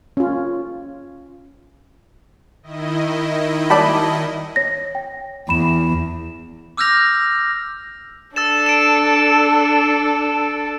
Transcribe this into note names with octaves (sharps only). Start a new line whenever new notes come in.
C#4 F4
D#3 E4 D#5
D5 A5 B5
C#5 A#6
G5
E2 B5 E7
D6 E6 F6 G6 A#6 F7
D4 A4 E6 A6 E7
D7 E7